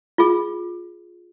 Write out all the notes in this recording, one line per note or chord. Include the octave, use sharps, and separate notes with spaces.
F4 G#4